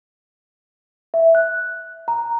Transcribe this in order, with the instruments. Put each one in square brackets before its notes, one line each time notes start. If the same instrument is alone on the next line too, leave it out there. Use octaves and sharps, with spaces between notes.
[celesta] E5
F#6
A#5